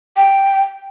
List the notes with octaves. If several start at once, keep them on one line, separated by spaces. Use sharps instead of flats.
G5